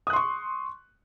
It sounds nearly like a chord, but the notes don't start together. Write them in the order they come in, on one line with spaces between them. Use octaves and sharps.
D#6 F#6 C6 C#6